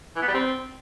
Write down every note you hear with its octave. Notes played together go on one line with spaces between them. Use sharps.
E3
B3
G3
C4